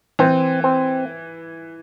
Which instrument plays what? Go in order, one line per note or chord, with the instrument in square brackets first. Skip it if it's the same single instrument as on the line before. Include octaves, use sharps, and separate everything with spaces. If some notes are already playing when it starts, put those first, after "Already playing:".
[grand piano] E3 [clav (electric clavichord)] C4
[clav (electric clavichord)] C4